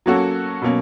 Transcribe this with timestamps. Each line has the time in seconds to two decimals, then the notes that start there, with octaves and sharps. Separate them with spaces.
0.06 F#3 A#3 C#4 F#4 A4
0.62 B2 F#3 A#3 C#4